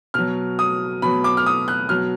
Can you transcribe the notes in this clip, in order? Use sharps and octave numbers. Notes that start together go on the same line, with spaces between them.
B2 F#3 F6
D#6
B2 F#3 B5
D6
F6
D#6
F#6
B2 F#3 F6